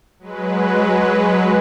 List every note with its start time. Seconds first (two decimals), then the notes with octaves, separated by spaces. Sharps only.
0.19 F#3 G#3 B4